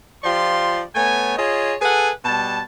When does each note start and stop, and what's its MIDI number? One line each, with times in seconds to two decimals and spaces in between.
0.24 0.83 53
0.24 0.83 65
0.24 0.83 67
0.24 0.83 74
0.24 0.83 84
0.95 1.37 57
0.95 1.37 59
0.95 1.37 73
0.95 1.37 80
1.37 1.75 65
1.37 1.75 68
1.37 1.75 73
1.37 1.75 75
1.82 2.10 68
1.82 2.10 69
1.82 2.10 71
1.82 2.10 78
1.82 2.10 80
2.25 2.61 47
2.25 2.61 55
2.25 2.61 81